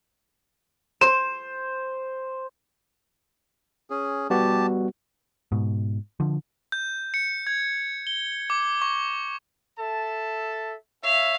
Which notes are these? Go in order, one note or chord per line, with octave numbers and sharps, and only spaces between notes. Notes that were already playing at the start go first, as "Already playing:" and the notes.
C5 E7
C#4 G#4
G3 B3 F#4 G4 A5
G#2 B2
D3 F3
G6
C#7
G#6
G7
D6
C#6
A4 E5 A5
C#5 E5 F5